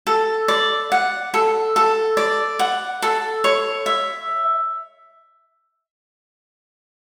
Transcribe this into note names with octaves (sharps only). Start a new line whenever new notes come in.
A4
D5
F#5
A4
A4
D5
F#5
A4
C#5
E5